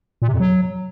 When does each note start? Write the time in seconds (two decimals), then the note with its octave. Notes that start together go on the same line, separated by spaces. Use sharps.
0.22 A#2
0.28 C3
0.34 F2
0.40 F#3